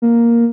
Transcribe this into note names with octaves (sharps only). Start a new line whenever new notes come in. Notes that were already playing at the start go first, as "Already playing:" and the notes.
A#3